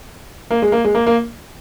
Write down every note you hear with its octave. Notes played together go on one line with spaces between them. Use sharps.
A#3
G#3
A#3
G#3
A#3
A#3